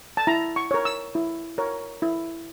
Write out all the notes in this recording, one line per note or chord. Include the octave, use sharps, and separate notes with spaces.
A5
E4 A#5
C#6
A#4 C#5
E6
E4
A#4 C#5
E4